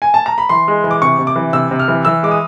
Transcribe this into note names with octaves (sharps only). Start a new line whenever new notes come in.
G#5
A5
A#5
B5
E3 C6
G#3
E3
D6
C3 C#6
C3
D6
E3
C3 E6
C3
F6
E3
E3 E6
G#3 D6
D#6